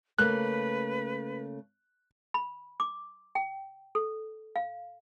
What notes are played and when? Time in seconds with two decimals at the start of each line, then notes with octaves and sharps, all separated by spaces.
0.18 C#3 A3 A#3 B4 F#6
2.34 B5
2.80 D6
3.35 G5
3.95 A4
4.56 F5